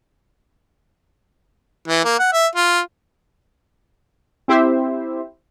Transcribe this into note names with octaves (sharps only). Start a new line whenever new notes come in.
E3
A#3
F#5
E5
F4
C4 E4 G4 C5 E5